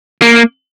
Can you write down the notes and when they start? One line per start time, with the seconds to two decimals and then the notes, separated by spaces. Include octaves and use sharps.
0.22 A#3